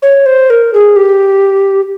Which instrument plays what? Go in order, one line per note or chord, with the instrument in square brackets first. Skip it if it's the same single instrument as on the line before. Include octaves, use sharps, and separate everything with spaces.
[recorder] C#5
C5
A#4
G#4
G4